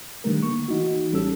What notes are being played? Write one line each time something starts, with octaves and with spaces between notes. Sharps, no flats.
D3 D#3 G3 A3 A#4
A#3 C#6
E3 D#4 F#4
A1 G3 C#4 A4 E6